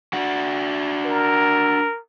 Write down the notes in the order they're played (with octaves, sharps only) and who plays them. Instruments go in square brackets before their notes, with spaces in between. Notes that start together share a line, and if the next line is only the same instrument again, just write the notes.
[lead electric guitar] D4 F#4
[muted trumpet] A#4